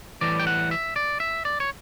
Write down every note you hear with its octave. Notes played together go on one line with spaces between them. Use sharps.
A2 E3 G3 D5
G5
F#5
E5
D5
E5
D5
C#5